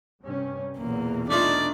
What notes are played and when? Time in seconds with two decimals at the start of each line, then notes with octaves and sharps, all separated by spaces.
0.22 G2 C3 C#4
0.77 B1 E2 A#2 A#3
1.30 A3 D4 D#4 F4 D5